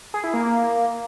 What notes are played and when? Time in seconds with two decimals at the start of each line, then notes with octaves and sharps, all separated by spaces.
0.14 G#4
0.24 E4
0.34 A#3